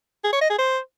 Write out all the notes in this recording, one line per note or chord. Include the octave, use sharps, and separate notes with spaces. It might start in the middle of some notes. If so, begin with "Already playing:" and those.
G#4
C#5
D#5
G#4
C5